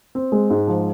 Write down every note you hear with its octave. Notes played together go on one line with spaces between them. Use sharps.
C4
G#3
G#2
F3